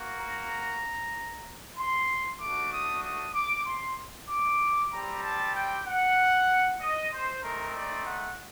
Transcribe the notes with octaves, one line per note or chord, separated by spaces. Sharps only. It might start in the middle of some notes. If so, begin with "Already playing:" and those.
Already playing: A#3 F#4
A#5
C6
A3 D4 F#4 D6
D#6
D#6
D6
C6
D6
G3 C4 G4 A#5
A5
G5
F#5
D#5
C5
A3 C4 D#4 A#4
D5
F#5